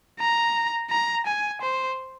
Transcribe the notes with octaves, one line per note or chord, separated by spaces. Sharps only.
A#5
A#5
G#5
C5